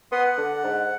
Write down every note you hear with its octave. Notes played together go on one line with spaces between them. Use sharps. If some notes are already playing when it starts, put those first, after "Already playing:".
B3 F#5 C6 D#6
F#5
D3
G#2